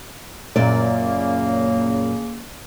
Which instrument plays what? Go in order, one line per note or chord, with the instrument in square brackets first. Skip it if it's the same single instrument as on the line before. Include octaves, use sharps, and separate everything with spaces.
[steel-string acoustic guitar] F#2 A#2 D5 [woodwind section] C#3 A#3